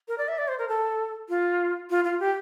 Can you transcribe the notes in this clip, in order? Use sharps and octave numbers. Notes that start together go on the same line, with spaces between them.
A#4
D5
E5
D5
C5
A#4
A4
F4
F4
F4
G4